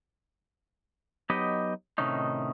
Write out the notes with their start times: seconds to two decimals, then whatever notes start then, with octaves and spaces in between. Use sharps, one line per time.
1.30 F#3 B3 D#4 G4 D#5
1.98 A2 C3 D#3 C#4 D#4